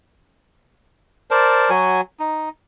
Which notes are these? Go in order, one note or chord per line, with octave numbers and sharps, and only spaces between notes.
A#4 C5 D5 A5
F#3 F#4 G#5
D#4